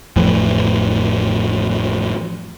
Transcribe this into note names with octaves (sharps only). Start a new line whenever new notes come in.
A1 F2 A2 E3